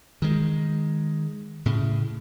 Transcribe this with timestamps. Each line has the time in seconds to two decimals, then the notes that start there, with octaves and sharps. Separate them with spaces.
0.22 D#3 G#3
1.66 A2 C#3